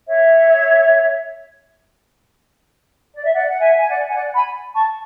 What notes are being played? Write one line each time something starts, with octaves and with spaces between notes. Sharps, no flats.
C#5 E5
D5
E5
D5 F#5
F#5
E5 G#5
G#5
D5 F#5
G#5
D5 F#5
G#5 B5
A5 C#6